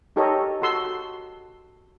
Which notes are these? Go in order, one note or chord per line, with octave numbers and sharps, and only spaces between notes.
D#4 G4 A4 A#4 C#5 D#5
F#4 A4 C6 E6